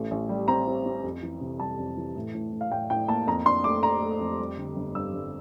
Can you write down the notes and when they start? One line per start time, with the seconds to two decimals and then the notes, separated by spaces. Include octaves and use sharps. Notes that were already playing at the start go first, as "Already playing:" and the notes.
Already playing: A1 A3
0.11 A1
0.29 G3
0.48 C4 A#5
0.67 C4
0.86 C4
1.04 F2
1.23 E3
1.41 C3
1.60 G3 A5
1.79 F2
1.97 E3
2.16 A2
2.35 A2
2.52 A2
2.61 F5
2.71 A2 G5
2.90 A2 G5
3.08 A#3 A5
3.27 F2 A#5
3.46 D4 C6
3.64 A3 D6
3.83 D4 A#5
4.02 A3
4.21 F2
4.39 G3
4.57 D3
4.76 G1
4.95 G2 E6
5.13 G1